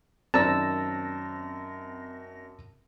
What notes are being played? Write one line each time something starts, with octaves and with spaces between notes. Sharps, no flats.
F#2 D#3 C4 D5 A5 A#5 E6 A#6